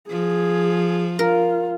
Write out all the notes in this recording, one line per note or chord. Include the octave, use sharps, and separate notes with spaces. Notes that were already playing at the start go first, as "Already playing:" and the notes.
F3 G#4
F4 A#4